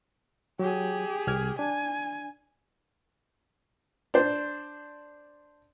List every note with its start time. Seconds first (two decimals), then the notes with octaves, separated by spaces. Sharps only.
0.59 F#3 G4 G#4
1.27 C2 F6 G#6
1.59 D4 G#5
4.14 D4 C5